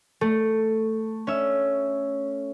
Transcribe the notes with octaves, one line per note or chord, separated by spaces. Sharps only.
A3
C#4 E5